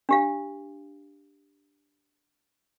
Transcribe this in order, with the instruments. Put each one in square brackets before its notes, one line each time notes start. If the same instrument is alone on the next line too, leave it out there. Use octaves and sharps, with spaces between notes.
[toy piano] D4 G4 F5